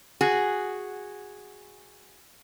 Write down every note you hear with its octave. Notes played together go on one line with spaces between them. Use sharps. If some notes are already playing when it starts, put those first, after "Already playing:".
F#4 G#4